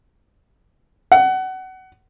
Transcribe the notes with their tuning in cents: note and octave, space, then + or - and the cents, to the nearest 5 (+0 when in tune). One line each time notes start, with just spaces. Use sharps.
F#5 +25